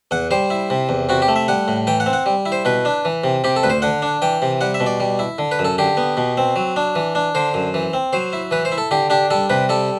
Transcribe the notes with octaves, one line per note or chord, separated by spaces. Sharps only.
E2 F#5
G3 C5
E4
C3
E2
C3 F#4
G4
A3
E5
G3 F#5
A2
E3 G5
F#5
C4
F#5
G3
E4
C5
B2 B4
D4
E3
C3
C3 G4
A4
D2 B4
C5
D3 F#5
D4
E3 G5
C3
G3 F#5
E5
B2
D5
G3
E4
D3
B4
F#2
A4
D3 G4
B3
B2
C4
F#3
D4
E3
D4
D3 C5
F#2
E3
C4
F#3 C5
E4
E3 B4
C5
E4
A4
D3 G4
D4 G4
G3 A4
C3 B4
G3 A4